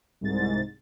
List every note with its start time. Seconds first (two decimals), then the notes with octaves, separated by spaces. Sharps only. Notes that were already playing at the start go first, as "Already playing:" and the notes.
0.21 C2 G#2 A6